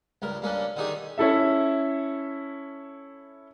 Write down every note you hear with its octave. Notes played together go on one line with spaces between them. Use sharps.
C#2 G2 A#4
G2 A#3 C#4 D4
D3 D#3 D#4 G4 G#4
C#4 E4 A4 E5